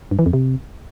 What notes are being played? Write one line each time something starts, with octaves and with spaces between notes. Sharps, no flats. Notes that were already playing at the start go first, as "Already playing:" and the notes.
G2
E3
F2
C3